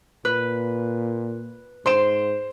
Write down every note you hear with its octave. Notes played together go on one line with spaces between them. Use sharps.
A#2 B4
G#2 C5 C6 D7 E7